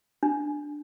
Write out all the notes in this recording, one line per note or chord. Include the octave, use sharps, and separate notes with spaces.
D4